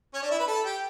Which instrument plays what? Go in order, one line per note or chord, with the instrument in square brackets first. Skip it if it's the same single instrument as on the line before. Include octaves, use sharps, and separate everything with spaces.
[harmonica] C#4 C#5
D4 D5
E4 E5
B4 B5
A4 A5
G4 G5